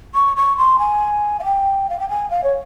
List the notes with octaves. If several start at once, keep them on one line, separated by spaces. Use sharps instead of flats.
C#6
C#6
C6
G#5
F5
G5
F5
G5
G#5
F5
C#5